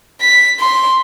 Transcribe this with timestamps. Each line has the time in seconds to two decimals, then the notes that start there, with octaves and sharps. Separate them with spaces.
0.21 B6
0.60 C6